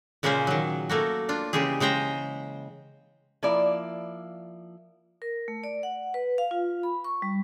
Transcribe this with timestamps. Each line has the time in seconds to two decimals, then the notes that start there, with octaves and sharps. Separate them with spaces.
0.23 A#2 C#3 G#3 A#3 C#4 C5
0.47 D#3 F#3
0.89 A3 A#3 F#4
1.29 D4 F4
1.53 C#3 E3 G#3 G4 G#4
1.80 C#3 G#3 C5 G5 A#5
3.43 F3 A#3 E4 D5
5.22 A#4
5.48 A3
5.64 D5
5.83 F#5
6.14 B4
6.38 F5
6.51 F4
6.83 B5
7.04 C#6
7.22 G3